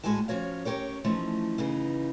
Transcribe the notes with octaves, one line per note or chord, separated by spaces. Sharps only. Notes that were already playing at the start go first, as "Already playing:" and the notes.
D2 A2 G#3 F#4 G#5 A5
F3 C#4 F#4 C#5 F5
C#4 D4 G4 A#4 C#5
E3 F3 A3 C#4 D#4
C#3 E3 B3 D#4